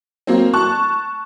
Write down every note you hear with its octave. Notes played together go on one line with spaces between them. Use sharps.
F#3 A#3 C4
A5 C#6 F#6